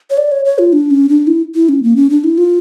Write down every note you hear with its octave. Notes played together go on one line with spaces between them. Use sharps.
C#5
D5
C#5
C#5
F4
D4
C#4
D4
E4
E4
C#4
A#3
C#4
D4
E4
F4